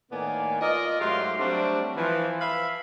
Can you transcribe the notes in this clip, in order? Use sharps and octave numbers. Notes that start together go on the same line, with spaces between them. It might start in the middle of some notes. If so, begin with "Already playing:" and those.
A2 D#3 A#3 B3 D5 G#5
F4 A#4 D5 D#5
G#2 F#3 A3 G4 F5 C6
F#3 G3 A3 C4 D4 F#4
E3 F3
B4 E5 F5 B5